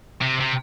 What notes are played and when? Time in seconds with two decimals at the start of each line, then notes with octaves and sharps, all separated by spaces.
0.22 C3
0.41 C3